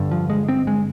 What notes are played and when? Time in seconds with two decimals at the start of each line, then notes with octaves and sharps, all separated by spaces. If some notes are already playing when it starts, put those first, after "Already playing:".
Already playing: G2 D3
0.11 F3
0.30 G#3
0.48 C4
0.67 G#3